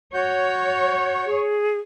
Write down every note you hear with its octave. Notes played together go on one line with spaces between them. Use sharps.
F#4 C#5 G6
G#4